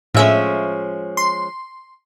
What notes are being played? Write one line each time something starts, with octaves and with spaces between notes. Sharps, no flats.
A2 F3 G#3 C#4 E5
C6